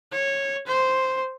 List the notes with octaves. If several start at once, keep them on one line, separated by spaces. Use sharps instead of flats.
C#5
C5